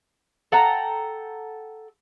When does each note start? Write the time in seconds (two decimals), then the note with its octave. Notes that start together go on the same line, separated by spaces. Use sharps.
0.52 A4 F#5 G5 A#5